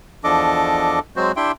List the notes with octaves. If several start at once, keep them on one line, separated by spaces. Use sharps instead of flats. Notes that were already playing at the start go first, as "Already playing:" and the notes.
E2 F3 D4 A4 D#5 D6
F#3 G#3 C4 F#4 C5
D4 E4 G4 E5 G5 C6